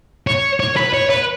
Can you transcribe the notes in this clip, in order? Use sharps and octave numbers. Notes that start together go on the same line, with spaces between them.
C#5
C#5
B4
C#5
B4